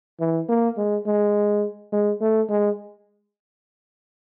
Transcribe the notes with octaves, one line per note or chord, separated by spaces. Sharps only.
E3
A#3
G#3
G#3
G#3
A3
G#3